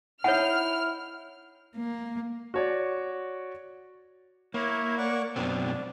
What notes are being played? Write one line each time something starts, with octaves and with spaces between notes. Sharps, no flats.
D#4 E4 C#5 F#5 F6
A#3
F#4 C#5 D5
A#3 E4 C#5
D5 F#5 C#6
F#2 B2 C4 D4